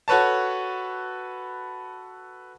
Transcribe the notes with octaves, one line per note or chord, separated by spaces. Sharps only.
F#4 A4 B4 C#5 A5